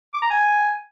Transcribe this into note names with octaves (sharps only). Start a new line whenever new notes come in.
D6
A#5
G#5